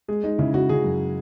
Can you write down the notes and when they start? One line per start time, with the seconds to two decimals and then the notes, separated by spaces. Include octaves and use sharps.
0.08 G#3 G#4
0.24 G#3 D#4
0.38 C#3 E4
0.54 C#3 F#4
0.69 C#3 G#4
0.84 F#2